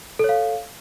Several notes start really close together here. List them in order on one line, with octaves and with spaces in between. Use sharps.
A4 C#5 F5